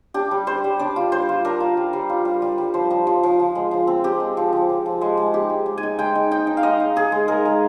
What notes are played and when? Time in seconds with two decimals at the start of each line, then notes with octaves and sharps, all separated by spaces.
0.14 D4 G4
0.31 G3
0.47 G3 C5
0.64 G3
0.79 D4 D5
0.96 F4
1.12 G3 C5
1.29 F4
1.45 D4 A#4
1.60 F4
1.77 G3
1.93 G3
2.09 F4
2.25 G3
2.42 G3
2.58 G3
2.74 F3 C5
2.90 F3
3.07 F3
3.23 F3
3.39 F3
3.55 G#3
3.71 F3
3.87 C4
4.04 C4 G4
4.20 G#3
4.37 F3
4.53 F3
4.69 F3
4.86 F3
5.01 G#3
5.17 G#3
5.34 D#4 G4
5.49 G#3
5.66 G#3
5.78 G#5
5.83 D#4
5.99 G#3 G5
6.15 D#4
6.31 D#4 G5
6.47 D#4
6.57 F5
6.63 G#3 D#5
6.80 D#4
6.96 D#4 G#4
7.12 G#3
7.28 G#3 A#4
7.45 G#3